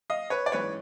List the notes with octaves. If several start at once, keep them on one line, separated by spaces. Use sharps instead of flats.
D#5 F5
B4 C#5
D5
A1 G#2 E3 B4 C#5